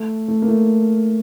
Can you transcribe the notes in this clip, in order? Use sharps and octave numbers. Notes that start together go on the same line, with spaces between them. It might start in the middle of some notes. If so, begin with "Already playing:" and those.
Already playing: A3
A3
A#3
A3